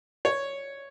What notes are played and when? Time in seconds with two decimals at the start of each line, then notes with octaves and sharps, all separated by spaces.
0.25 C#5